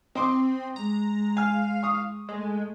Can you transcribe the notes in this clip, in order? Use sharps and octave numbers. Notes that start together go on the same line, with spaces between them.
C4 D#5 C6 D6
G#3 A#5
F5 G#5 F6
C#6 D#6
G#3 A3